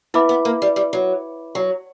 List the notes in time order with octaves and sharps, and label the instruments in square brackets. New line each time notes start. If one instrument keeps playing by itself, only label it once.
[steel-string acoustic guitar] B3 [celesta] E4 B4 E5 B5 D6
[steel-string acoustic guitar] B3
A#3
G3
G3
F#3
F#3